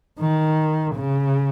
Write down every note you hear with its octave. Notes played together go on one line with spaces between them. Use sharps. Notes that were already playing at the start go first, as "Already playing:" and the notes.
D#3
C#3